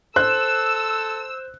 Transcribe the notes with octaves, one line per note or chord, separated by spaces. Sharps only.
A4 C5 E6 F#6